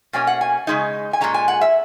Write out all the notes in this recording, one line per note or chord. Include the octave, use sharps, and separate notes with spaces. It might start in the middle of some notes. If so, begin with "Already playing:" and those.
B2 A#3 C#4 G#5
F#5
G#5
C#3 G#3 D#4
G#5
A#2 G#3 C#4 A#5
G#5
F#5
E5